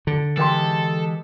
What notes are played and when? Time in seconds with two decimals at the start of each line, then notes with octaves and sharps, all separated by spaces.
0.07 D3
0.37 E3 G#3 G4 A4 A#4 G5 C6